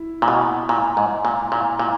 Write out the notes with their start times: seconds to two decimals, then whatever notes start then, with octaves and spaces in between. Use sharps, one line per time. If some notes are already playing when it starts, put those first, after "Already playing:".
Already playing: E4
0.22 A#2
0.28 B2
0.69 A#2
0.97 G#2
1.25 A#2
1.52 A#2
1.79 A#2